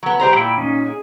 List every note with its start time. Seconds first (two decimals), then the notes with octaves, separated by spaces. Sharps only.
0.03 F#3 B3
0.20 G3 C5 A#5
0.33 A#2 E4 G5 B5
0.58 C#4 D#4
0.86 G#4